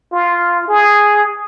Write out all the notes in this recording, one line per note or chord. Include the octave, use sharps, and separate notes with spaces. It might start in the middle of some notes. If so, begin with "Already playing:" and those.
F4
G#4